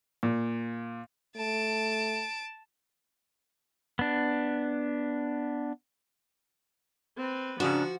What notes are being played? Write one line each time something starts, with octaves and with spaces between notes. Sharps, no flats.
A#2
A3 A5 D7
B3 D4
C4 B4
G#2 C#3 F3 D4 F#4